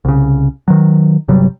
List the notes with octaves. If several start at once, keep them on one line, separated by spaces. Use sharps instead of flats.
C2 C#3
D#3 F#3
G1 C3 F#3 G3